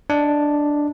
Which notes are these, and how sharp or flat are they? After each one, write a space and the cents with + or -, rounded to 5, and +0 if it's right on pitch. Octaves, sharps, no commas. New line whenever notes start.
D4 +0 D#5 +0